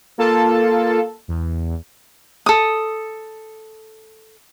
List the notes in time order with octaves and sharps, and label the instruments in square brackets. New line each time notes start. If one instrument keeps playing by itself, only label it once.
[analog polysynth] A#3 F4 A4 A5
E2
[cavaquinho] A4 D#6